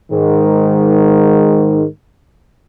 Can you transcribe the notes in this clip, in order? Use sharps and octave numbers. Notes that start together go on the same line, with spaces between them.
G#2 D#3